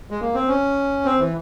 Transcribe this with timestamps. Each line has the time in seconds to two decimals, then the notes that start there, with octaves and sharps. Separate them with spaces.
0.11 G#3
0.21 A#3
0.34 C4
0.48 C#4
1.05 C4
1.19 E3